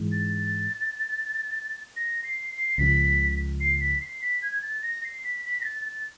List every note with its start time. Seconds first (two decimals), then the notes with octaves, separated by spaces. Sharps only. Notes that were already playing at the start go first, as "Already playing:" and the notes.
Already playing: G#2 E3 G#3
0.12 A6
1.96 A#6
2.24 C7
2.51 C7
2.78 C#2 C#3 F3 B6
3.61 C7
3.81 B6
4.01 C7
4.22 B6
4.42 G#6
4.62 A6
4.83 A#6
5.04 C7
5.24 B6
5.45 B6
5.61 A#6
5.65 A6
5.85 A6